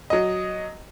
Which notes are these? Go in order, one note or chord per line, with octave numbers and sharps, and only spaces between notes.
F#3 D#5